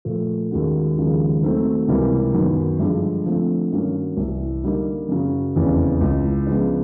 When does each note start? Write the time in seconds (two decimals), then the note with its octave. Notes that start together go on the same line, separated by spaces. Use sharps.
0.05 A#2 F3 A3
0.51 D#2 D#3 G#3 C#4 F#4
0.97 D#2 C#3 F3 G#3
1.42 D#3 F#3 A3 C4
1.88 C#2 C3 E3 G3 A#3
2.34 F#2 D#3 F#3 B3
2.79 G2 D3 F3 G#3
3.26 D3 F3 A3 C4
3.72 G2 D#3 F#3 A#3 C#4
4.17 C2 C3 E3
4.63 D3 G3 A#3 D#4
5.09 F#2 C#3 F#3
5.56 F1 E2 C#3
6.01 C#2 C#3 E3
6.47 C#3 F3 G#3 B3 D4